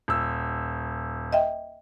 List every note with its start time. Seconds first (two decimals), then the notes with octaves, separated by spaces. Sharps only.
0.08 D#1 E6
1.33 D#5 E5 G5